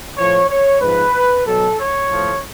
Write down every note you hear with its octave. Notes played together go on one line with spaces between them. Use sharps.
A2 F3 C#5
C#5
G#2 F3 B4
B2 F#3 A4
C#5
A2 F3